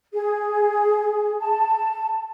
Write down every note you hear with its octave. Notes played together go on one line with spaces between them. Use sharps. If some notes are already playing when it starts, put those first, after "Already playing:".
G#4
A5